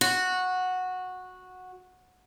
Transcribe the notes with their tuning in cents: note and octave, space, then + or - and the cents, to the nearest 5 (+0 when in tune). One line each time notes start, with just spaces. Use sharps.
F#4 -10